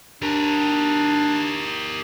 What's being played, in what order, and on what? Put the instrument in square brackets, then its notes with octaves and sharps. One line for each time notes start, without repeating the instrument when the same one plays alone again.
[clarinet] D4 [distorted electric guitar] G4 A#4